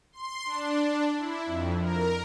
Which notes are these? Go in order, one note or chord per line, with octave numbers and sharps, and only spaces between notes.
C6
D4
E4
F2
A#4